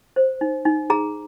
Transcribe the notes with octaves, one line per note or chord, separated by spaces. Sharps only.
C5
D#4
D#4
G#4 A#5